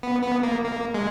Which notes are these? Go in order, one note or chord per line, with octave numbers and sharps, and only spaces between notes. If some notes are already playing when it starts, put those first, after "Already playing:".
B3
B3
A#3
A#3
G#3